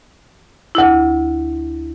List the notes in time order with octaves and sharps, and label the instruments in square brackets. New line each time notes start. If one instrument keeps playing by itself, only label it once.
[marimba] D2 E4